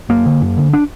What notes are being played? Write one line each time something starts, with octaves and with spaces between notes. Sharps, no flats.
F#2 A#3
D3
F#2
D3
D4